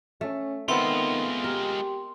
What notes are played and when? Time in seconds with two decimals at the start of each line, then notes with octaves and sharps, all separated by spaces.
0.21 A3 C#4
0.68 D#3 G#3 A3 B3 C4 F4 C6
1.44 G4 A#4